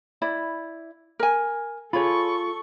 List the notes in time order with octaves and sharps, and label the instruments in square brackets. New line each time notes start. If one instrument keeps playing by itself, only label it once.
[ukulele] E4 D5 B5
A#4 G#5
[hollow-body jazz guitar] F4 G#4 [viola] A4 C#6 [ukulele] C#5 B5